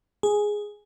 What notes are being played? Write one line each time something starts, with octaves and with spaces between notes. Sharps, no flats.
G#4